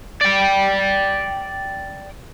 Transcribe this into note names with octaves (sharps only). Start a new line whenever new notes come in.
D5 G5